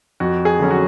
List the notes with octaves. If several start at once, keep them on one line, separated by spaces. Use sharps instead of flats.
F2 F#4
G#4
D3 F#3 C#4
F#4